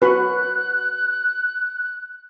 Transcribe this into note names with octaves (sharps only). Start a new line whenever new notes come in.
F#4 B4 F#6